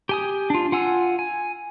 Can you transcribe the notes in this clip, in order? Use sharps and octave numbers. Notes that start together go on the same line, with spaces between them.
G4 G#5 D#6
D4 F4
F4 F#5 G#5 E6
G#5